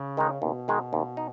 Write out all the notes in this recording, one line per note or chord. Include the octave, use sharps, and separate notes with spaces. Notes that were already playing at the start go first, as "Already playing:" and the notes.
Already playing: C#3
D#3 G#3 D#4
D#2 B2
D#3 G#3 D#4
D#2
D#4